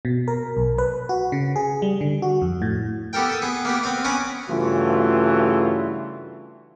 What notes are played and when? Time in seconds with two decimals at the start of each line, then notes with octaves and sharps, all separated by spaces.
0.05 B2
0.28 A#4
0.57 B1
0.78 B4
1.09 F#4
1.32 C#3
1.56 G#4
1.82 G3
2.01 D3
2.22 F#4
2.42 F2
2.62 A2
3.13 B3 G4 A4 A#4 G5
3.29 A4 D#6
3.42 B3 G#4
3.65 A#3 B3 G4
3.83 B3 C4 F5
4.04 B3 C#4 F#5 G#5 A#5 D6
4.48 G2 C#3 E3 A3 F4 F#4